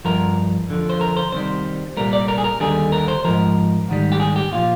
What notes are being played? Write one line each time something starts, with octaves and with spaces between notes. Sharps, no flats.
G2 F3 A#4
F2 D3 F3
C5
A#4
C5
C2 C3 D#3 G3 C5
C2 A#2 G3 A#4
D5
A#4
G#4
A#4
D#2 D3 G3 G#4
A#4
C5
G#2 F3 A#4
G#2 D#3 G3
G4
G#4
G4
A#2 F3 F4